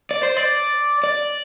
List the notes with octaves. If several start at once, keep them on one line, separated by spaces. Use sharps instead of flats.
D5
C5
D5
D5